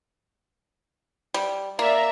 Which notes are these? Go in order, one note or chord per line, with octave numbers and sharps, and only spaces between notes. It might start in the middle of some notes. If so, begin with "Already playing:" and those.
G3
A#3 D5 E5 A#5